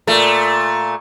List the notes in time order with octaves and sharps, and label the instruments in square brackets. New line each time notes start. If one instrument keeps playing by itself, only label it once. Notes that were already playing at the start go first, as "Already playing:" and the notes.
[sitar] A#2 A3